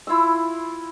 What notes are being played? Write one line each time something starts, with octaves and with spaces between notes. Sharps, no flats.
E4 F4 B5 E6